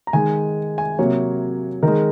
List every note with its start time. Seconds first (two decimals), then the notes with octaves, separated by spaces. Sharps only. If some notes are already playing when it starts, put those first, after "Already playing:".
0.07 A#5
0.13 D#3 G#3 G#5
0.78 G#5
0.99 C3 F#3 A#3 C#5
1.83 D#3 G#3 A#4